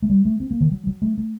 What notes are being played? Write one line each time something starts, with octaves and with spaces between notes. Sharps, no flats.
A3
G3
A3
C4
A#3
D#3
F#3
F#3
A3
A3